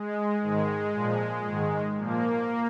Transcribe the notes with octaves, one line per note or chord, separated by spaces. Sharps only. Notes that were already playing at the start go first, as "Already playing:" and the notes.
Already playing: G#3
G#2 D#3 G#3
A#2 F3
G#2 D#3
A#2 F3 A#3